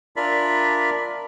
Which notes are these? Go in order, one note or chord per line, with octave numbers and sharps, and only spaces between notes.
D4 F4 A#4 D5 E5 B5